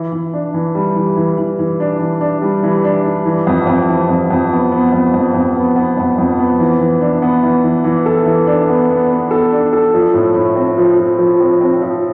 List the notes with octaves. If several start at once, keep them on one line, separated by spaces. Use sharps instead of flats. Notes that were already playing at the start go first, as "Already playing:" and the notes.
Already playing: E3
E3
D4
E3
G3
E3
E3
E3
E3
D4
E3
D4
G3
E3
D4
G3
E3
F2
F2
E3
F2
F2
B3
B3
F2
F2
F2
B3
B3
F2
F2
B3
E3
E3
D4
B3
E3
E3
E3
A4
E3
D4
B3
B3
B3
A4
D4
A4
F3
A2
A2
C4
F3
F3
F3
C4
C4
F3